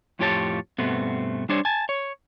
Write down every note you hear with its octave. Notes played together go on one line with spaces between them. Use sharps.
F2 A2 F4 G4 C#5 A5
G2 B2 A3 B3 C4
G3 D4 C5 C#5
G#5 A5
C#5